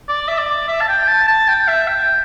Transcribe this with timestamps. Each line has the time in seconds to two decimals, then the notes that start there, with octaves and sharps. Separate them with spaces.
0.09 D5
0.28 E5
0.38 D5
0.68 E5
0.81 A5
0.88 G5
1.08 A5
1.28 A5
1.48 G5
1.68 E5
1.88 G5